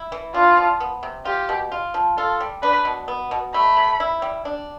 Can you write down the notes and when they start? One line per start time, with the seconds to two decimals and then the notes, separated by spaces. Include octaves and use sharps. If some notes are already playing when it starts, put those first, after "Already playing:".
Already playing: E4
0.12 E3
0.34 D4 F4
0.57 F3
0.80 B3
1.03 C3
1.25 F4 G4
1.49 B2
1.72 F4
1.94 F3
2.16 F4 A4
2.40 G3
2.63 D4 B4
2.85 B2
3.08 B3
3.31 B2
3.53 A3 B5
3.77 C3
4.00 E4
4.22 G3
4.45 D4